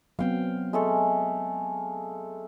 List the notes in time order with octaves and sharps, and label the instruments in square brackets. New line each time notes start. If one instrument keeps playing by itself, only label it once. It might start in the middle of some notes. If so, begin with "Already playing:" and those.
[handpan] F#3 B3 C4 [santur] F5 G5
[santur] G#3 A3 A4